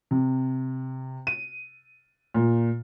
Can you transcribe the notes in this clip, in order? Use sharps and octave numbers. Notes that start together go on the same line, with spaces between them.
C3
D#7
A#2